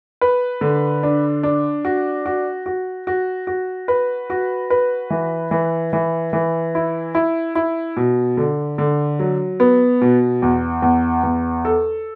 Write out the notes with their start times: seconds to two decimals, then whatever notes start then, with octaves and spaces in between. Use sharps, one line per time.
0.21 B4
0.61 D3
1.03 D4
1.43 D4
1.85 F#4
2.26 F#4
2.66 F#4
3.07 F#4
3.47 F#4
3.88 B4
4.30 F#4
4.70 B4
5.10 E3
5.51 E3
5.93 E3
6.33 E3
6.75 E4
7.15 E4
7.55 E4
7.97 B2
8.37 D3
8.78 D3
9.19 F#3
9.60 B3
10.01 B2
10.42 E2
10.82 E2
11.23 E2
11.65 A4